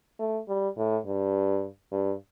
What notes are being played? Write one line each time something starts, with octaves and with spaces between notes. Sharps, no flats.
A3
G3
A2
G2
G2